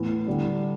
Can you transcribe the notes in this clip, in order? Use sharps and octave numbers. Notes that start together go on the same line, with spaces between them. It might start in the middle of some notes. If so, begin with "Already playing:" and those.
Already playing: A2 E3 B3
D3 G3 D4